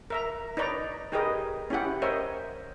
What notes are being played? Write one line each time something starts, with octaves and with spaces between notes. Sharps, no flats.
A#4 E5 A#5
D#4 B4 C#5 D5 A#5
D#4 G4 G#4 A#4 B4 D#5
C#4 E4 G4 F#5
A#4 C5 C#5 D#5 E5